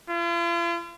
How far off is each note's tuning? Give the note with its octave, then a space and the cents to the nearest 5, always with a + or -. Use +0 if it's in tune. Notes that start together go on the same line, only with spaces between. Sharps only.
F4 -45